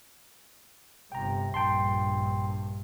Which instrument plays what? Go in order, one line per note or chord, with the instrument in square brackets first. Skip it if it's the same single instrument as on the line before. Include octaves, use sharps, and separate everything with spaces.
[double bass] G1 C3 [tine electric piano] G5 A#5
[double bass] A#1 G2 [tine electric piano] G5 A5 C6